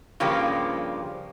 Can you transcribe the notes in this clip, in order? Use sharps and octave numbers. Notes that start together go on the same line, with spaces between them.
G2 C#3 F3 A#3 D4 G4